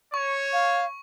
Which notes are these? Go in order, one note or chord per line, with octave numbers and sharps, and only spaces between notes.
C#5 C#6
F5